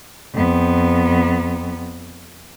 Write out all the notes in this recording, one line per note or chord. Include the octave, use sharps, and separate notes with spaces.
F2 B3